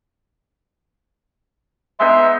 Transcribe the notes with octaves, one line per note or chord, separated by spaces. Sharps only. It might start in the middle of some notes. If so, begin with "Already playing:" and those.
G#3 B3 D#4 E5 C6